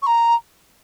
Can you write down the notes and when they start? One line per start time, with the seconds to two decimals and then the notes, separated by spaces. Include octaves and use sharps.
0.02 C#6
0.06 A#5